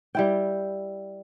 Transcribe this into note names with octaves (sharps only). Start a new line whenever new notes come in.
G3 E4 G5